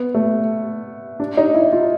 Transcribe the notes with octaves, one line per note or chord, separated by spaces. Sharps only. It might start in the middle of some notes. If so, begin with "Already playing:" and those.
Already playing: B3
A3
D4
D#4
E4
F4